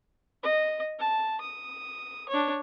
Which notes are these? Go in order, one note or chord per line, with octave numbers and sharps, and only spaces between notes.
D#5
A5
D#6
D4 C#5